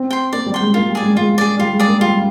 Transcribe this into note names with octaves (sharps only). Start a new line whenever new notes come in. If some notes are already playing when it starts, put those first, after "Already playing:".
Already playing: C4
G5 C6
A#3 D5
G3
G5 C6
G#3
A#3 F4
G3
G#4 D5
G#3
G#3 F4
G#4 D5
G3 F4
G#3
G#4 D5
A#3
G3 F4